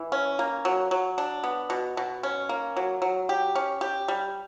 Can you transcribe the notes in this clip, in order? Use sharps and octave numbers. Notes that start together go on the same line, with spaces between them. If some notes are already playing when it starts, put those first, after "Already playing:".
Already playing: E3
C#4
A#3
F#3
F#3
D4
B3
B2
B2
C#4
A#3
F#3
F#3
G4
C#4
G4
G3